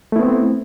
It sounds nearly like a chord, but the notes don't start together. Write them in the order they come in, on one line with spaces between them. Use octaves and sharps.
A3 E4 B3 C4